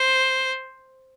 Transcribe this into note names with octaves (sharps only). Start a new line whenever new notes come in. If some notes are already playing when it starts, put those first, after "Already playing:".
Already playing: C5